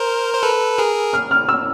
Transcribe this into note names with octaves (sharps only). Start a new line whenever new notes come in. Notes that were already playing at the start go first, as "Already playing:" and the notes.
Already playing: A#4 C5
C5
A4 B4
G#4 A#4
F6
F6
E6